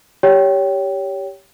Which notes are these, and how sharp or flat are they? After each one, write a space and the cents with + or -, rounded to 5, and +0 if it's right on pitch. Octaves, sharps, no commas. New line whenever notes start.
G4 +0 C#5 +20 G5 -5